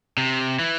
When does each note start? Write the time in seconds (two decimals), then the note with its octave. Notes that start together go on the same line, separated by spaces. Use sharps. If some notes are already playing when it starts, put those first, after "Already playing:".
0.17 C3
0.59 E3